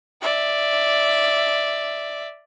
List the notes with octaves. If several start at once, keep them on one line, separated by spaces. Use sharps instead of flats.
D5 E5